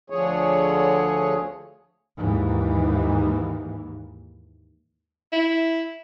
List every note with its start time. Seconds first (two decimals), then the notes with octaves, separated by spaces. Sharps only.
0.10 D2 D3 F3 G#4 C#5
2.17 D#2 G#2 E3
5.32 E4